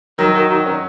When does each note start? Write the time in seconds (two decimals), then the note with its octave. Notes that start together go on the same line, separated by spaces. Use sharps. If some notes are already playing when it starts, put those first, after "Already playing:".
0.19 D#3 F#3
0.34 D#3 F#4
0.50 D#3 F#4
0.66 D#3 C#4